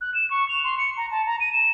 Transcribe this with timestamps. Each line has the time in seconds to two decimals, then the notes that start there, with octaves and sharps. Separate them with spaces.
0.01 F#6
0.14 E7
0.31 C#6
0.49 F7
0.64 C6
0.78 C#7
0.97 A#5
1.11 A5
1.26 A#5
1.40 D#7
1.53 E7